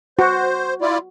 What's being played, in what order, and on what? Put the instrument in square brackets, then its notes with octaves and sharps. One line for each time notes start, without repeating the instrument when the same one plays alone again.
[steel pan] F#4 [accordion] C5
[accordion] E4 F4 D5